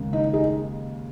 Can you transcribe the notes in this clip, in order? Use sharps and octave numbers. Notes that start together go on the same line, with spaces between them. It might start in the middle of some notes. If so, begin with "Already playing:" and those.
Already playing: D#2 C#3 G#3
D#4
D#4 G#4